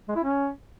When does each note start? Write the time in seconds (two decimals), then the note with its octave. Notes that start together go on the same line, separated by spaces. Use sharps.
0.09 G#3
0.16 E4
0.23 C#4